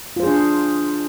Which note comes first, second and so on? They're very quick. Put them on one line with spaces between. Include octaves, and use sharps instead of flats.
F4 C5 G#4 D4